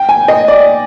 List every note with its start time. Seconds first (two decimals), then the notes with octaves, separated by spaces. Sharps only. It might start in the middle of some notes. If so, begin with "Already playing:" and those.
Already playing: G5
0.09 G#5
0.28 D#5
0.48 D5